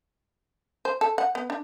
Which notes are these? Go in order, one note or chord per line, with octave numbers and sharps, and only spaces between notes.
C5
A4
F#5
B3
D4